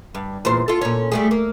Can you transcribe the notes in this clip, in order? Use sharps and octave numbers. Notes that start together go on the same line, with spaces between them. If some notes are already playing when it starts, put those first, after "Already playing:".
G2
E2 A#2 C5
F4 A4
A#2 C#4
G3 A3 G#4
A#3